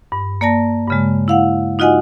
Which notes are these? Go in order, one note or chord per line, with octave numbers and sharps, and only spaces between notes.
G2
A#3 D5 A5 A#6
G2 C#3 G#3
E4 F5 F#5
D#4 F4 F#4 D#5 F#5 G#5